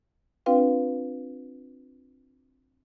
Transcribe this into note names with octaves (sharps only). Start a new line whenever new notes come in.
C4 D4 F4 B4 F5 G5